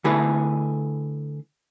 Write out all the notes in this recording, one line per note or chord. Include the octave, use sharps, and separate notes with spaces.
D3 A3 E4 G#4 A4 B4